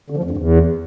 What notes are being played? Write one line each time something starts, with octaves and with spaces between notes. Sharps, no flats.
D3
F3
F2
G2
E2